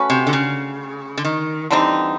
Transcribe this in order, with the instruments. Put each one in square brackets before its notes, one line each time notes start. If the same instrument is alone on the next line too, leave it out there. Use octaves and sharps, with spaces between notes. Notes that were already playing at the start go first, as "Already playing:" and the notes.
Already playing: [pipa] A3 C#4 F#4 B4
[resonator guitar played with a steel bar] C3
D3
C#3
D3
D#3
[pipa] D3 G3 C4 D#4 [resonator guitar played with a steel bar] E3